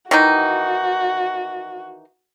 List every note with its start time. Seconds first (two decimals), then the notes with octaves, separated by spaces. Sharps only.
0.11 D#3 E3 D#4 F#4